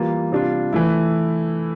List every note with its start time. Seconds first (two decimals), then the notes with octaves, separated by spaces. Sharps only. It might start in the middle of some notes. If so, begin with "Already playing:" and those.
Already playing: E3 G3 A#3 F4
0.32 C3 G3 D4 F4
0.73 E3 A3 E4